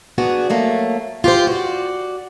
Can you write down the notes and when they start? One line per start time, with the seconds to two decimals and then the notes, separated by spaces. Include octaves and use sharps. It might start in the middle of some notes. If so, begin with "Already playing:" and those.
0.18 B3 D4 F#4 G#4
0.50 F#3 A3 A#3
1.24 F4 G4 G#4 C5
1.47 F#4 D5